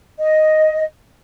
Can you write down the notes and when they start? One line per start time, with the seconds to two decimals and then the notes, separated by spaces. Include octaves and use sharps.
0.19 D#5